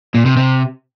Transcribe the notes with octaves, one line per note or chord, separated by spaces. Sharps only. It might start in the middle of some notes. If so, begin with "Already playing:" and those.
A#2
C3
C3